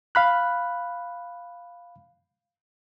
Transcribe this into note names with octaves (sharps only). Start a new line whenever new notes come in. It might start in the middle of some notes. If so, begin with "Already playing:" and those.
F5 B5 F#6